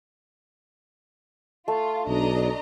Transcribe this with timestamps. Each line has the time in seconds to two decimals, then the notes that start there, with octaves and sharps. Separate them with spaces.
1.68 A3 F4
2.07 B1 D4 D#5 A#5